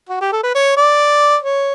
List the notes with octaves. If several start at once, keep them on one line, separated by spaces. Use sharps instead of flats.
F#4
G4
A4
B4
C#5
D5
C#5